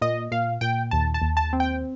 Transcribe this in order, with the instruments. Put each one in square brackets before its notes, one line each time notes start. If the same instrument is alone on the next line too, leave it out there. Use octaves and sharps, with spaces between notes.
[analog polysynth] A#2 D#5
A#2 F5
A#2 G5
D#2 A5
A5
D#2
A5
C4
G5